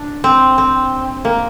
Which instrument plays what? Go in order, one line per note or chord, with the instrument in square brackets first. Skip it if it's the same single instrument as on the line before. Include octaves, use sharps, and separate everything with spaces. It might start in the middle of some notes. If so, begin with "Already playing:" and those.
Already playing: [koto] D4
C4
C4
A#3